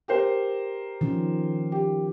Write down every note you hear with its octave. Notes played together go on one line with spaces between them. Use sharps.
G4 A#4 C5
D#3 F3 C#4
G4